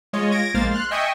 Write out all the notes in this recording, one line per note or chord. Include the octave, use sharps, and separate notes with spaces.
G#3 F4 C#5 D#5
G#6 A#6 D7
A#1 G#3 A#3 C5 F5 A6
C6 F6 F#6
D#5 E5 G5 G#5 C#6 D#6